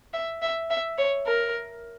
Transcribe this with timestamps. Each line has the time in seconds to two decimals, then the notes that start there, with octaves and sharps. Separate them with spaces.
0.14 E5
0.42 E5
0.70 E5
0.98 C#5
1.27 A#4